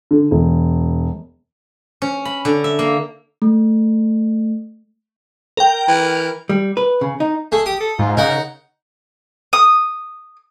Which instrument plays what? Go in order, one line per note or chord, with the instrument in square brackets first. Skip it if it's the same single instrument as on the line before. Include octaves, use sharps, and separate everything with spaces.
[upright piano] D3
E1
[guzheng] C#4
B5
D3
E5
A#3
[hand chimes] A3
[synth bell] A#4 G5
[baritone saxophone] E3
[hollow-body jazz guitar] G3
B4
C#3
D#4
[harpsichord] A3 [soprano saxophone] G#4
[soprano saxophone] G4 [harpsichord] D#6
[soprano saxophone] A4
[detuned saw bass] G#2 [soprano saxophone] F4
[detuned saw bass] C#3 [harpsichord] D#4 F#5 [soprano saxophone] A#4
[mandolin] D#6